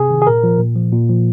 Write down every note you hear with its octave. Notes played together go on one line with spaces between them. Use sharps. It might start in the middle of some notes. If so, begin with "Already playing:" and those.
Already playing: C3 G#4
D#3
G#4
A#2 A#4
F3
A#2
F3
A#2
F3